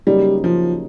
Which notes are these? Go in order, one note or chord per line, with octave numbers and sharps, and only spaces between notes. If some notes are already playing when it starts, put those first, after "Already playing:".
C#3 F#3 G3 A#3 D#4 G4
F3